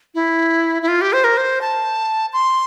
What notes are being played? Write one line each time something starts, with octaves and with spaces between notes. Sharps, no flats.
E4
E4
F4
G4
C5
A#4
C5
A5
C6